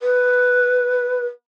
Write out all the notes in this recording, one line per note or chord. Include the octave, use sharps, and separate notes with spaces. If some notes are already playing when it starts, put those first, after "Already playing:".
B4